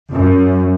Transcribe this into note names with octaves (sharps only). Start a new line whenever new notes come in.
F#2